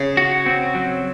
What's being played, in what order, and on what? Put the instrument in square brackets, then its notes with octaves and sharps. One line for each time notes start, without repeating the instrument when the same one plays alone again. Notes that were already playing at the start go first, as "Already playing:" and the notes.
Already playing: [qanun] C#3
[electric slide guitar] F#4
C4
F#3